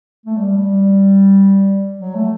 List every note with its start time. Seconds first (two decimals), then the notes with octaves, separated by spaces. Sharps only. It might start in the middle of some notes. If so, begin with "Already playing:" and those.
0.26 A3
0.37 G3
0.58 G3
2.00 F#3
2.15 A3